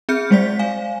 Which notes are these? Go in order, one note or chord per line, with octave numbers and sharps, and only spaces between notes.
C4 G#4 E5 F6 G6 C#7
G3 G#3 C5 D5 B6
F5 G#5